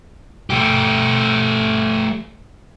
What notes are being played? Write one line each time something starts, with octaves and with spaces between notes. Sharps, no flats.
A3 G4